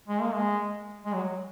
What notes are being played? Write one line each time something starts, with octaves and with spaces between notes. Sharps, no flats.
G#3
A#3
G#3
G#3
F#3